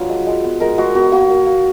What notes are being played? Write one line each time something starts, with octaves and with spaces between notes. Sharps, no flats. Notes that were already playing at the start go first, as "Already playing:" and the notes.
Already playing: F#3 D4 F4 B4
G#3
G#3
B3
G#3 A#4
G#3 F#4
B3 F#4
A#3 F#4
A#3
A#3